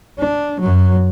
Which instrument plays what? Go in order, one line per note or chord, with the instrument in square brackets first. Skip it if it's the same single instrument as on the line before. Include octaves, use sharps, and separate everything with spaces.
[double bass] D4
F#2 F#3